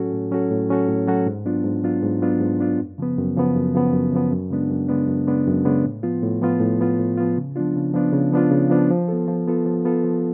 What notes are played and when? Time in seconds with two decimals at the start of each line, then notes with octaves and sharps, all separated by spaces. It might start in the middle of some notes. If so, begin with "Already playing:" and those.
Already playing: A2 F#3 C#4 F#4 A4
0.13 A2
0.31 F#3 C#4 F#4 A4
0.51 A2
0.69 F#3 C#4 F#4 A4
0.88 A2
1.07 F#3 C#4 F#4 A4
1.26 G#2
1.45 F#3 B3 D4 F4
1.64 G#2
1.83 F#3 B3 D4 F4
2.03 G#2
2.22 F#3 B3 D4 F4
2.41 G#2
2.60 F#3 B3 D4 F4
2.79 F#2
2.98 C#3 F3 B3
3.18 F#2
3.36 C#3 F3 B3
3.56 F#2
3.74 C#3 F3 B3
3.93 F#2
4.12 C#3 F3 B3
4.31 F#2
4.50 C#3 G#3 B3 D4
4.70 F#2
4.88 C#3 G#3 B3 D4
5.08 F#2
5.27 C#3 G#3 B3 D4
5.47 F#2
5.65 C#3 G#3 B3 D4
5.84 A2
6.03 F3 B3 F4
6.23 A2
6.42 F3 B3 F4
6.60 A2
6.79 F3 B3 F4
7.00 A2
7.17 F3 B3 F4
7.37 C#3
7.56 F3 B3 D4 F4
7.76 C#3
7.94 F3 B3 D4 F4
8.13 C#3
8.32 F3 B3 D4 F4
8.51 C#3
8.70 F3 B3 D4 F4
8.90 F3
9.08 B3 F4 A4
9.28 F3
9.47 B3 F4 A4
9.65 F3
9.85 B3 F4 A4
10.04 F3